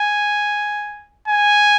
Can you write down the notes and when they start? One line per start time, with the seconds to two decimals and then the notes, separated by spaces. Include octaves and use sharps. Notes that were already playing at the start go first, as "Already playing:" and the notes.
Already playing: G#5
1.28 G#5